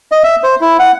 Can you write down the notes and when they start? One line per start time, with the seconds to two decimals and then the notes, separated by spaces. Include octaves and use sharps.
0.12 D#5
0.24 E5
0.43 C5
0.61 E4
0.79 F#5